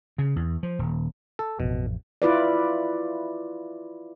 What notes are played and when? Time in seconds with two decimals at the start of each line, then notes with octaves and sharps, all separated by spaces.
0.18 C#3
0.36 E2
0.63 F3
0.79 D#1
1.39 A4
1.60 A1 F2 B2
2.22 E4 F4 B4 D5